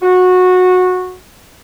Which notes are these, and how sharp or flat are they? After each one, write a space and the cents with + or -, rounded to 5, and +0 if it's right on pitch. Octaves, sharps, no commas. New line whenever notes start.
F#4 -15